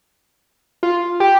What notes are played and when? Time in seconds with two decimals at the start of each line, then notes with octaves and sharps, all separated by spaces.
0.83 F4
1.20 G4